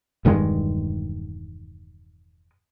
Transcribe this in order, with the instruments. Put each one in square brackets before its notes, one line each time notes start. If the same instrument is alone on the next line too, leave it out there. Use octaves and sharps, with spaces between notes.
[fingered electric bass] E1 G2 D#3 G#3